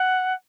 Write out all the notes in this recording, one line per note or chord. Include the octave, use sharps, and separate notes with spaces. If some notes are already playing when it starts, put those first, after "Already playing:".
Already playing: F#5